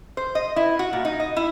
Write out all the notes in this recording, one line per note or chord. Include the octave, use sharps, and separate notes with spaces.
C5
D#5
E4
F#4
A#2
D#4
D#5
E4